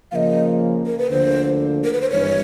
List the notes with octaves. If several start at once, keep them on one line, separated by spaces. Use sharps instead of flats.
C#3 F3 A#3 D#5 F5
A#4
B4
D2 D3 F3 A#3 C5
A#4
B4
C5
G#1 G2 E3 C#5